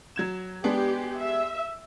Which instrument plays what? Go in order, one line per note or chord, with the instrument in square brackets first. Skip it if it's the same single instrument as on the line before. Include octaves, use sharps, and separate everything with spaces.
[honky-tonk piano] F#3 G#6 E7
[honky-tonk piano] G#3 B3 D4 [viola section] G4
[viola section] E5